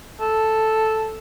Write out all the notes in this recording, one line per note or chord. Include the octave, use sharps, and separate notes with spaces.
A4